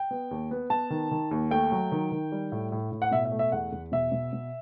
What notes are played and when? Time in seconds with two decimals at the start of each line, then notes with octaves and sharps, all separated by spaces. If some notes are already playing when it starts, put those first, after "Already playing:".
Already playing: G5
0.11 B3
0.31 D#2
0.51 B3
0.70 B3 A5
0.90 D#3
1.11 D#3
1.31 D#2
1.51 A3 G5
1.72 F#3
1.92 D#3
2.12 D#3
2.32 G3
2.52 A2
2.72 A2
2.92 A2
3.02 F#5
3.11 B2 E5
3.25 E5
3.32 A3
3.39 E5
3.52 E2 F#5
3.72 E2
3.92 B2 E5
4.12 B2
4.33 B2